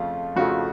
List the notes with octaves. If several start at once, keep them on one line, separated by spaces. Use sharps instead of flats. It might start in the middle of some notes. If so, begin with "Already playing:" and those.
Already playing: F2 C#3 F3 A3 F4
F2 C#3 F3 A3 F#4